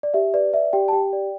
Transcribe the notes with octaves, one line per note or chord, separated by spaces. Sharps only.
D5
G4 E5
B4 D5
D5 E5
G4 G5
A5
G4 G5
D5